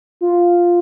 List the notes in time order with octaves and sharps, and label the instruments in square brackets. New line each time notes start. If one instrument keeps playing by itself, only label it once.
[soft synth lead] F4